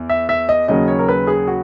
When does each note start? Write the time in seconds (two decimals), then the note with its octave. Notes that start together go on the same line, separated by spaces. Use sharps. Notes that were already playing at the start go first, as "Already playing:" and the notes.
Already playing: E2
0.09 E5
0.29 E5
0.49 D#5
0.68 D#2 C#3 F#3 D#5
0.88 C#5
0.99 A#4
1.08 B4
1.27 G#4
1.47 F#4